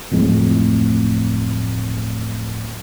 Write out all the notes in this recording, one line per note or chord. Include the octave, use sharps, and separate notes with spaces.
D1 F2 A2 G#3